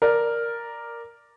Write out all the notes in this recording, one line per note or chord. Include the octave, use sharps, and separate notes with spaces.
A#4 D5